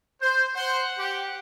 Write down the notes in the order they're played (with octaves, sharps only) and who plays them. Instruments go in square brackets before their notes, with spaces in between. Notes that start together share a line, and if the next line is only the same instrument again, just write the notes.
[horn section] C5 [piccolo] G6
[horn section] C5 [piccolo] F#5
[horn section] G4